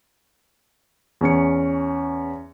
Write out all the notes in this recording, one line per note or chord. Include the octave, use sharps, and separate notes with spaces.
E2 C#4 C#7